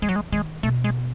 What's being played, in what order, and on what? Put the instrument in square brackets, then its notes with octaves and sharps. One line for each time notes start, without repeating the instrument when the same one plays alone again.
[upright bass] E3 [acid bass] G#3
[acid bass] F#3
G#3
[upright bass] D#3 [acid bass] G#3
[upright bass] B2 [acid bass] A3
[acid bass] G#3